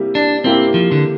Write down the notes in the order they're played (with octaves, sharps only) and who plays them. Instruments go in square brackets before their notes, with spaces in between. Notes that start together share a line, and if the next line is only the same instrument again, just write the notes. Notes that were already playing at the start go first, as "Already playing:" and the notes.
Already playing: [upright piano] C3 G3 A#3 E4 G4
[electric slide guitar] D4
[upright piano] C3 G3 A#3 E4 G4 [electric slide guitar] C4
[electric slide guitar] F3
D3